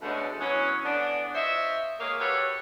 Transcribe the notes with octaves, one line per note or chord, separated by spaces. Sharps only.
B2 D3 E3 G#3 A3 C#4
E3 F#3 B3 C#4
D3 E3 B3 D4
F4 C5 C#5 D#5 E5
G#3 A#3 G#4 C#5 F5
F#4 G4 A4 B4 C#5